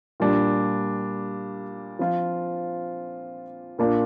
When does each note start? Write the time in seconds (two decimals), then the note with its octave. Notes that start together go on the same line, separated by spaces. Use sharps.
0.20 A#2 G3 D4
1.99 F3 C4 F4
3.78 A#2 A#3 D4 F4